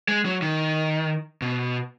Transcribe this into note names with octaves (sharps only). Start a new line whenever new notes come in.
G#3
F#3
D#3
B2